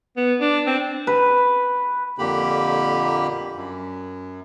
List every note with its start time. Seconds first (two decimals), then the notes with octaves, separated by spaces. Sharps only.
0.17 B3
0.41 D4
0.67 C4
1.07 B4
2.18 F2 A#2 D3 A#3 G4 B5
3.55 F#2